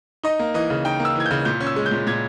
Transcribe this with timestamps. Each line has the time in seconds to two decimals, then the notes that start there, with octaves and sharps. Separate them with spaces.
0.23 D#4 D#5
0.39 A#3
0.54 E3 D#5
0.70 C#3
0.85 D#4 G5
1.00 A#3
1.05 E6
1.15 E3 G#6
1.26 C#3 G6
1.45 A#2 G6
1.60 C#4
1.67 E6
1.76 G#3
1.86 G6
1.91 A#2
2.07 A#2 G#6